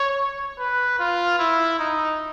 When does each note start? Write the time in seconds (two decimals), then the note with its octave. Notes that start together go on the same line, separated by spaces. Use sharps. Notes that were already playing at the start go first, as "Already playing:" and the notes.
Already playing: C#5
0.59 B4
0.99 F4
1.39 E4
1.79 D#4